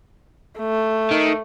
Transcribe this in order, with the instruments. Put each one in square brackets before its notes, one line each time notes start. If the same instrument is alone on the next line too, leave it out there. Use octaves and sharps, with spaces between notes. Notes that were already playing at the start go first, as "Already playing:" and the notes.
[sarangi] A3
[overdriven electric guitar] D#3